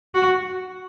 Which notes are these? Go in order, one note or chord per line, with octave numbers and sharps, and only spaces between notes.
F#4